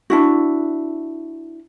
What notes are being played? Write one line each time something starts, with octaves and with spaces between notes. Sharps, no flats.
D4 E4 F#4